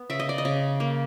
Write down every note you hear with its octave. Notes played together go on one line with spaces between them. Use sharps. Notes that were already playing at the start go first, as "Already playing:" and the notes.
Already playing: B3
C#3 E5
D#5
D5
D#5
C#3
A#3